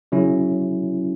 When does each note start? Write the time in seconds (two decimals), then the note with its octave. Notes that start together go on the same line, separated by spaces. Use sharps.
0.12 C#3 F#3 C#4 E4